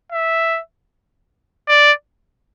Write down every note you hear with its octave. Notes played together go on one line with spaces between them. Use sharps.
E5
D5